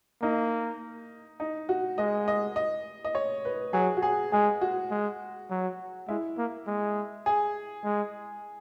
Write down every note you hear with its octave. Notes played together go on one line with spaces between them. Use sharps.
A#3 D#4
D#4
F#4
G#3 D#5
D#5
D#5
D#5
C#5
B4
F#3 G#4
F#4
G#4
G#3 G#4
F#4
G#3
F#3
G#3 E4
A#3
G#3
G#4
G#3